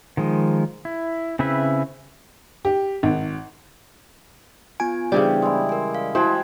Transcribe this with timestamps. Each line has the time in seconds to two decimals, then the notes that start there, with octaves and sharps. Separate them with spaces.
0.17 D#3 F3 G#3
0.85 E4
1.39 C#3 C4 E4 B4 E5
2.65 G4
3.03 G#1
4.80 B3 F4 G#5 D7
5.12 C#3 E3 G3 B3 D4 G4 C5 D5
5.42 G#3 E4
5.69 A#4 G#5
5.95 F5
6.15 G#3 E4 F#4 C5 G5 A5 G#6